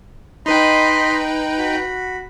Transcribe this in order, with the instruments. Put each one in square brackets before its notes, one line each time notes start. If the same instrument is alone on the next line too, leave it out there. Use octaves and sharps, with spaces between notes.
[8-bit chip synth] D#4 B4 G5 [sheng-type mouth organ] D#5 B5 C6
[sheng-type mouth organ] F#4 B5